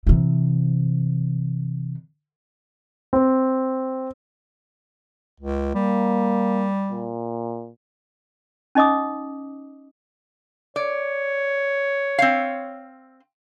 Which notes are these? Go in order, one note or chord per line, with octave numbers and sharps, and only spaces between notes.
C3 E3
C4
C#2
G3 A#3
A#2
C#4 D#4 D#5 D6 D#6
C#5 D5
C4 F5